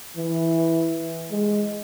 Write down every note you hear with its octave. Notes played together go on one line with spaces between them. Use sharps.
E3
G#3